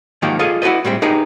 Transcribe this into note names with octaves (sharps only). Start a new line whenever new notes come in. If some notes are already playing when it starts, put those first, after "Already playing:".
G#2 D#3 F3 F#3 A#3 G4
F4 G#4 A4 D#5
E4 F#4 A#4 B4 D#5
A2 G3 G#3 C4
D#4 G4 G#4 A#4 B4 E5